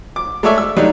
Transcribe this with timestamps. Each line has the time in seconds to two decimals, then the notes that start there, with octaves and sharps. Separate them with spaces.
0.16 D6
0.43 G#3 A3 A4 C#5 D5 E5
0.58 E6
0.77 F#3 G3 A3 D4 D#4